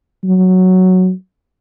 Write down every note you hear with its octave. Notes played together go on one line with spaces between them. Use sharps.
F#3